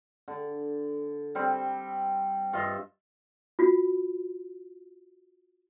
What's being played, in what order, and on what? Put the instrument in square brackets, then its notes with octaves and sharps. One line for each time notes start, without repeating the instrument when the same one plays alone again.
[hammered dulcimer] D3
G3 C4
G2 F4 D#5 E5
[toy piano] F4 F#4